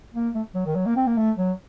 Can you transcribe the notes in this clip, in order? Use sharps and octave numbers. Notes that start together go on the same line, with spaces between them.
A#3
A3
F#3
D#3
F#3
A#3
C4
A#3
A3
F#3